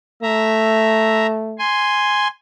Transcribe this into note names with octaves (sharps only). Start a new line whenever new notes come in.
A3 E5 A#5
G#5 C6